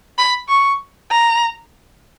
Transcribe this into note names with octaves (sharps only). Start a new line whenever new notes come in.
B5
C#6
A#5